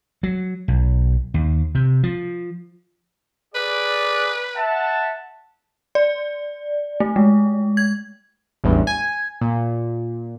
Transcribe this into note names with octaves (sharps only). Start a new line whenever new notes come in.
F#3
B1
D#2
C3
F3
G#4 B4 D5
E5 F#5 A5
D5
A3
G#3
G#6
A1 E2 G2
G#5
A#2